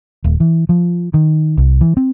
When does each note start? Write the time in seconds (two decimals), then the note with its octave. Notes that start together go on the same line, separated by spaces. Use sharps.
0.24 D#1
0.40 E3
0.69 F3
1.14 D#3
1.58 C2
1.81 E3
1.97 C4